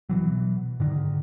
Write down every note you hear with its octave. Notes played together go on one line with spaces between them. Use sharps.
B2 E3 F#3
G#2 D3 D#3